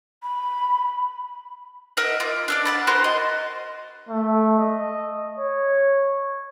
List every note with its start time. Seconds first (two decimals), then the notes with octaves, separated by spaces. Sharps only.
0.23 B5
1.97 A#4 D#5 E5 F#5
2.20 F4 D6
2.48 D4 A4 D5
2.65 F#5 A5 B5
2.87 F#4 A#4 C5 C6
3.04 D#5
4.09 A3
4.59 D#5
5.39 C#5